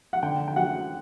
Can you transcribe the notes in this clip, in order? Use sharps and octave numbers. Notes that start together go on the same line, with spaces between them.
F#5
D3 G5
G5
F#3 F#5